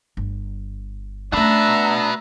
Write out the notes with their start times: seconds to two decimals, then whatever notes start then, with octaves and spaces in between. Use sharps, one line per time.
0.17 G1
1.33 A3 C#4 D4 F#4 B4 E5 A#5